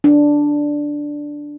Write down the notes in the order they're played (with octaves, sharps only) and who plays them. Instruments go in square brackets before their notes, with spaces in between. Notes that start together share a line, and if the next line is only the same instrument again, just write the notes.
[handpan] D4